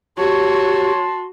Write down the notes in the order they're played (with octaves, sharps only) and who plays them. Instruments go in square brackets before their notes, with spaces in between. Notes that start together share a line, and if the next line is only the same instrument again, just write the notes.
[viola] F#4 [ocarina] G4 [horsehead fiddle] C#5 [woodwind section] A5 C6